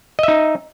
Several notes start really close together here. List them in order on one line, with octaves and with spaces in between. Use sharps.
D#5 E5 D#4